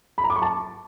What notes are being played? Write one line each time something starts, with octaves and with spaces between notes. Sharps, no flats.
B5
A#5
D6
C#6
A5